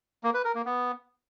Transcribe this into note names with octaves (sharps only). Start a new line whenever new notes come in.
A#3
B4
A#4
A#3
B3